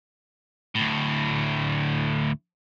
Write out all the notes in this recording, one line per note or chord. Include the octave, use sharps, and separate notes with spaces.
D2 A2